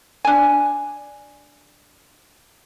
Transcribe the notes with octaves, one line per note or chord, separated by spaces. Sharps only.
D4 G#5